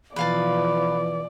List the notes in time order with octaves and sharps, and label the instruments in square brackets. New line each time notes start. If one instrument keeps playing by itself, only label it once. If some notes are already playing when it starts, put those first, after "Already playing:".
[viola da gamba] B2 F3 [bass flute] E3 [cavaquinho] B4 F5 A5 [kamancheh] D5